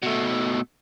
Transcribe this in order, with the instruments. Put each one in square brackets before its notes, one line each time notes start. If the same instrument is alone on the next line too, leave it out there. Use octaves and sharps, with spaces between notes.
[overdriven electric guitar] B2 A3